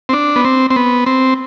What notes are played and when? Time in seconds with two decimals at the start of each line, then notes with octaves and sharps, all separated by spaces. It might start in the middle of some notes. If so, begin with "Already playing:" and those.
0.09 C4
0.13 D4
0.36 B3
0.45 C4
0.71 C4
0.76 B3
1.06 C4